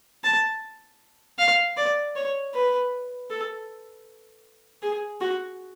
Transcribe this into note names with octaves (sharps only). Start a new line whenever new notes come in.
A5
F5
D5
C#5
B4
A4
G#4
F#4